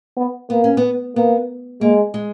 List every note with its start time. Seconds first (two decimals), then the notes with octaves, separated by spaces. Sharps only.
0.17 B3
0.50 A#3 B3
0.64 C#4
0.77 B3
1.16 A#3 B3
1.81 G#3 A#3
2.14 G#3